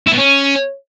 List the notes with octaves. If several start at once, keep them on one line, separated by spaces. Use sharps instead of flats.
E4
B2
C#4